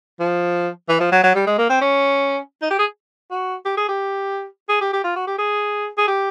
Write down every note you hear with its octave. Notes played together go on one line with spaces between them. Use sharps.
F3
E3
F3
F#3
F#3
G3
G#3
A#3
C4
C#4
D#4
G4
G#4
F#4
G4
G#4
G4
G#4
G4
G4
F4
F#4
G4
G#4
G#4
G4